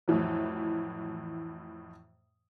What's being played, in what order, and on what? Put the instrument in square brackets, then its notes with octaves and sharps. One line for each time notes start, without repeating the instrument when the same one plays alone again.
[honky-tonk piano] F2 A2 E3 F#3